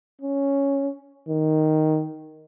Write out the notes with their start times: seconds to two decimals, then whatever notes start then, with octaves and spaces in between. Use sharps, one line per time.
0.22 C#4
1.29 D#3